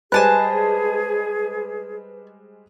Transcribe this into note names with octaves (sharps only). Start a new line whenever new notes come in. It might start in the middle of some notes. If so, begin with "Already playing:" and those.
G3 G#3 G#4 B4 C5 G#5 A5 F#6